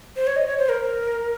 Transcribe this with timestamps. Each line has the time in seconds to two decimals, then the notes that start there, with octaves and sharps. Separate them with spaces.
0.16 C5
0.27 C#5
0.36 D#5
0.47 C#5
0.58 C5
0.69 A#4